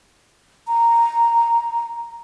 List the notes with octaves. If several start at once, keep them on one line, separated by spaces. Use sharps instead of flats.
A#5